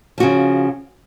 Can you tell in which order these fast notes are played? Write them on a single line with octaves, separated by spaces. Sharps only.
F3 F#4 C#3